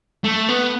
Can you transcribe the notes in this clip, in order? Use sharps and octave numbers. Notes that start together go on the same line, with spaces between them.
A3
B3